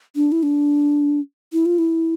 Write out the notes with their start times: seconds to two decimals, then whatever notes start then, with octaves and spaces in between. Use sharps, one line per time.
0.16 D4
0.32 E4
0.43 D4
1.53 E4
1.66 F4
1.78 E4